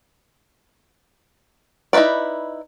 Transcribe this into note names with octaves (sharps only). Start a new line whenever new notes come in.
D#4 E4 F#4 B4 D5